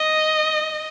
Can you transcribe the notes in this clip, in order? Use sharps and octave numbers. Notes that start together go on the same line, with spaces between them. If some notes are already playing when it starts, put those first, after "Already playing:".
Already playing: D#5